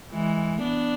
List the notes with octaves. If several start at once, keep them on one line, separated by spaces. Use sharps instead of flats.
E3 G#3
B3 D4